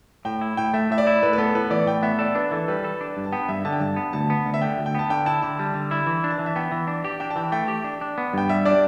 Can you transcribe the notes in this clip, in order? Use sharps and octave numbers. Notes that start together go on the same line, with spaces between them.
A2 G5
E4
A2 G5
A3 E5
A2 E5
D5
E4
A2 B4
B4
B3 A4
A2 B4
E3 D5
A2 G5
B3 E5
A4 D5
D4 B4
E3 A4
G3 B4
A4
D4
G2
A5
B3 G5
G2 E5
D3 A5
G5
G2 A5
B3
D2 A5
B3
D2
E5
D3 G5
D2
G5
B3 A5
D3 G5
E4 A5
D3 A5
G3
D3
E4
E3
D4
A5
E3
E5
B3 G5
E3
D4
G4 G5
D4 G5
A5
E3 G5
A3 G5
G4
D4
D4
B3
G2 G5
G3 E5
D4 D5